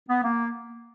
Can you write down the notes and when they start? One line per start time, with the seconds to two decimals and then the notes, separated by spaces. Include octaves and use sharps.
0.09 B3
0.23 A#3